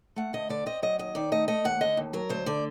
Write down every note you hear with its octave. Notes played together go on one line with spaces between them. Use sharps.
A3 F#5
D2 D#5
D3 D5
C4 D#5
F#3 D#5
D#2 D#5
D#3 D5
A3 D#5
A3 D#5
D#2 F#5
D3 D#5
D#2
F#3 A#4
D2 C5
D3 D5